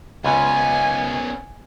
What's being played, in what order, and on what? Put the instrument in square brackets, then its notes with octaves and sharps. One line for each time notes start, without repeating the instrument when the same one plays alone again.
[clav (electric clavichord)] C#2 [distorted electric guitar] B3 C#4 [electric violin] G#5